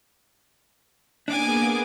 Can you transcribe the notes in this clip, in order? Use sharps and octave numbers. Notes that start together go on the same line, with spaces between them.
A#3 B3 D4 G#4 D5 G#5 D6